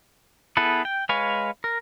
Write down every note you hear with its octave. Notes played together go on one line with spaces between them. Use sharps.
B3 E4 G#4 A4 B4
G5
G#3 B4 C#5 F5 G#5
A#4